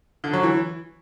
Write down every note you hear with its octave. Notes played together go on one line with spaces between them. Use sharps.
D3
F#3
E3